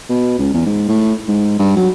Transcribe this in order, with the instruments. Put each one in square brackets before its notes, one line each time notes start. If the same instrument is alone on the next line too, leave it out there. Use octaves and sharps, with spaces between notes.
[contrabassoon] B2
C#2
E2
G#2
A2
G#2
G2
F#3